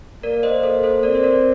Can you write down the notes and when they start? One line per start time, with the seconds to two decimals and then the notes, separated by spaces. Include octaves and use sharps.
0.23 A#3 A#4 D5
0.43 C5 D#5
0.63 A4 C5
0.83 A4 C5
1.03 C4 A#4 D5
1.15 C5
1.24 A#4 D5